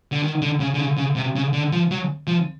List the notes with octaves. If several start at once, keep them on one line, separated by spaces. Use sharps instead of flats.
D3
D#3
D3
C#3
D3
C#3
C#3
C3
C#3
D3
F3
F#3
F3